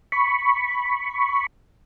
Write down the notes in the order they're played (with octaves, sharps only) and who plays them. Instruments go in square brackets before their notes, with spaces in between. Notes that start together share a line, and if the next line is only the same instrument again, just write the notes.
[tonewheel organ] B5 C#6